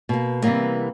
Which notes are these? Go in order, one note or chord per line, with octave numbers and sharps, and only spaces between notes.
B2 A#3
C3 E3 F#3 G3 A#3 B3